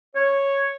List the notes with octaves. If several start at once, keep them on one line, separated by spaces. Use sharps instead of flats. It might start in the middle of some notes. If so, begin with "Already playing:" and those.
C#5